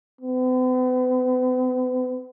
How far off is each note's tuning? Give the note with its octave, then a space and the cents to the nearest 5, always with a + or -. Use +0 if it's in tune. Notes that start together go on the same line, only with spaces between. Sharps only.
B3 +45